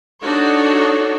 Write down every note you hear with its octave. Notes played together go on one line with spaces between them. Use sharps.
D4 D#4 F#4 A4 C#5